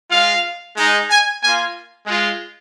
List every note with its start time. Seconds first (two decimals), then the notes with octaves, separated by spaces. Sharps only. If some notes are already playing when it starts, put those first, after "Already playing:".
0.10 G#3 F4 F5
0.76 G#3 D#4
1.09 G#5
1.41 A#3 F4 G#5
2.07 G#3 F4